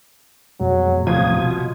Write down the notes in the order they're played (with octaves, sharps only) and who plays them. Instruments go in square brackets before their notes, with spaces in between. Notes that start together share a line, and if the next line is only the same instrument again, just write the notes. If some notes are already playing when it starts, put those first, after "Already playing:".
[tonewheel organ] F2 B2 G#3 [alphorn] F#3
[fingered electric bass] D#1 A1 F3 [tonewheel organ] C3 D#6 G#6 [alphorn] F4
[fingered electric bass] B2